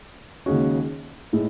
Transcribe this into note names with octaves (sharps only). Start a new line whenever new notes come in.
D#2 C#3 G#3 C#4 F#4
A2 G#3